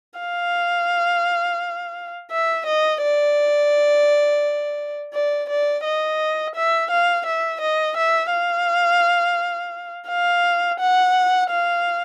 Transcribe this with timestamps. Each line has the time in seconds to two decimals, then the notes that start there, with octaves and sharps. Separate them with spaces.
0.19 F5
2.31 E5
2.66 D#5
3.02 D5
5.14 D5
5.49 D5
5.84 D#5
6.55 E5
6.91 F5
7.26 E5
7.61 D#5
7.97 E5
8.32 F5
10.09 F5
10.80 F#5
11.50 F5